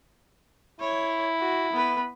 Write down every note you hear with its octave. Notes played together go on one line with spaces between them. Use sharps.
E4 C#5
F#4
B3 B4